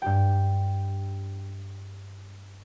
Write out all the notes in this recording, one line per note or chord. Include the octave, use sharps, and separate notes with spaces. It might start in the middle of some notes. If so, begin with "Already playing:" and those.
G2 G4 G5